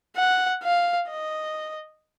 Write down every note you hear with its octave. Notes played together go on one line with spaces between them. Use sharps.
F#5
F5
D#5